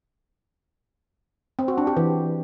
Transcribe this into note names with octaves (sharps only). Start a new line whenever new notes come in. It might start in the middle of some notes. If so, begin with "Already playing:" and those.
C4
F#4
D4
G4
E3